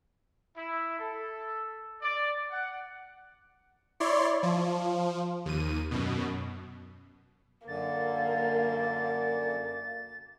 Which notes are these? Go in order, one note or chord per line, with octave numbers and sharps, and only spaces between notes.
E4
A4
D5
F#5
E4 C#5 D5 C6
F3
D#2 D#7
F#2 B2
F#2 D3 A#3 A6